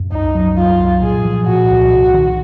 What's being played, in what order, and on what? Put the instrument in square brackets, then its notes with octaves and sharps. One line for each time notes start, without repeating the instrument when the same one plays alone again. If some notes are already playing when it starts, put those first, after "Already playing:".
Already playing: [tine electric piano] F#2
[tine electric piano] C2 [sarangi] D#4
[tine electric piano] F#3
[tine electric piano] F#3 [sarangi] F4
[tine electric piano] C2
[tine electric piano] A#2 [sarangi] G#4
[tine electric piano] F3
[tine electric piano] A#2 [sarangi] F#4
[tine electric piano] C2
C3
D#3